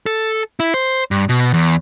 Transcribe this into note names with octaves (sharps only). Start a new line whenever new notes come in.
A4
E4
C5
G2
B2
E2